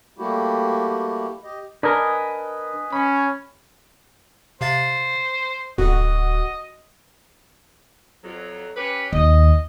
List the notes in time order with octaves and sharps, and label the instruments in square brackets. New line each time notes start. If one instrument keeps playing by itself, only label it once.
[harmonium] G3 A3 A#3 E4 F#4 G4
G4 D#5
[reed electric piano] D4 A#4 [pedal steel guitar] B4 D#5 G#5
[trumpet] C#4 [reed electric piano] B5
[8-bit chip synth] C3 F5 A6 [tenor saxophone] C5
[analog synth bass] D1 [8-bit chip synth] F2 [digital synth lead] F#4 [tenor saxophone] D#5
[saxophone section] F2 F#3
C#4 G4 B4
[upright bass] D#2 [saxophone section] D#5